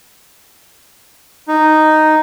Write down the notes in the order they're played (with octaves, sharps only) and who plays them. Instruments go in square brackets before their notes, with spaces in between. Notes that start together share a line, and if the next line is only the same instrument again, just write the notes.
[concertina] D#4